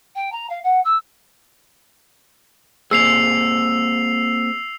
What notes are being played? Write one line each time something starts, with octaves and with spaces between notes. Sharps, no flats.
G5
A#5
F5
F#5
E6
A#3 C4 G#4 E6 C7 F7